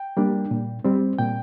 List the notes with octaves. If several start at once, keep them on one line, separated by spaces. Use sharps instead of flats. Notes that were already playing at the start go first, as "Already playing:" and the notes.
Already playing: G5
G3 A#3 D4
A#2
G3 C4
A#2 G5